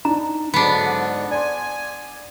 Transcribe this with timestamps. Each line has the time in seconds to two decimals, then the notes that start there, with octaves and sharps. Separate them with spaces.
0.05 D4 D#4 A#5
0.54 G#2 D3 F#3 B3 D4 B5
1.31 D5 G#5 C6